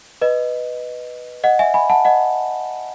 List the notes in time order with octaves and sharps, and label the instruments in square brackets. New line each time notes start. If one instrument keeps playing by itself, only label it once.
[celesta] B4 D#5
D#5 F#5
E5 G#5
G#5 B5
F#5 A5
D#5 F#5